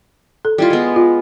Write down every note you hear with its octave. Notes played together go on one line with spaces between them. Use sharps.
A4
G3 E4 F4
G#3 B3
F4